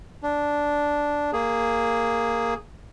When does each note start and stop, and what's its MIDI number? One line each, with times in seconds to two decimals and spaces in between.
0.23 1.31 62
1.33 2.54 58
1.33 2.54 68